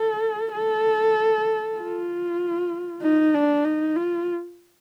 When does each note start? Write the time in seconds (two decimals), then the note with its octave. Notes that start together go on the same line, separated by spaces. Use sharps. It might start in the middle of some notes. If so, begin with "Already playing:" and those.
Already playing: A4
0.54 A4
1.78 F4
3.03 D#4
3.34 D4
3.65 D#4
3.96 F4